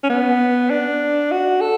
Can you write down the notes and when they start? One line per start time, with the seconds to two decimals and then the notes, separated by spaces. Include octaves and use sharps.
0.04 C#4
0.10 B3
0.71 D4
1.32 F#4
1.61 A4